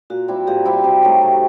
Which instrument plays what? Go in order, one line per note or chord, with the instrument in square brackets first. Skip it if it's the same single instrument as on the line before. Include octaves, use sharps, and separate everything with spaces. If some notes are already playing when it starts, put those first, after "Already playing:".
[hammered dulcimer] A#2 [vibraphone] F#4
[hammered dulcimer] G3 C4 E4
[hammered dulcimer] A#2 [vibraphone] G4
[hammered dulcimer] G3 C4 E4
C3
D#3 F#3 A3
C3